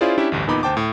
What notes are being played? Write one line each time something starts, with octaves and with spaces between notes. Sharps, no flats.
C#4 E4 F4 G#4 C5 D5
C#4 D4 E4 G4 E5
A1 D2 G2
E2 A#2 B3 D#4 B5 D6
D2 C5 G5 A5 D6
A2